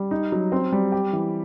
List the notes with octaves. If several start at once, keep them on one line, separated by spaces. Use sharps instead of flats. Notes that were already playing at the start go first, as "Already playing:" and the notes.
Already playing: G3
D#4
F#3
C4
G3
G4
E3